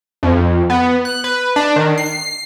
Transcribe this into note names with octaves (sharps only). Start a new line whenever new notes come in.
F2
B3
F#6
B4
D4
D#3
C7